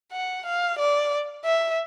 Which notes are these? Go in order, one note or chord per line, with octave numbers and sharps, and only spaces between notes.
F#5
F5
D5
E5